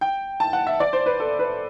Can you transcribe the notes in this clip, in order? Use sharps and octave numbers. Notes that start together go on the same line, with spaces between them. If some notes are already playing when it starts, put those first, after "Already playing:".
G5
A5
F#5
E5
D5
C5
B4
A4
B4